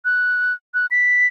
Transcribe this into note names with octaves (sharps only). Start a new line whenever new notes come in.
F#6
F#6
B6